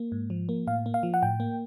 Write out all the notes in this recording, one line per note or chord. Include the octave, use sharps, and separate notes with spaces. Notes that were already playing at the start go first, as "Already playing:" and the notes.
Already playing: A#3
G#2
F3
A#3
A2 F5
A#3
F5
F3
F#5
A2 G5
A#3